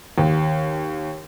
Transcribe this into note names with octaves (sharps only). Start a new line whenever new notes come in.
D#2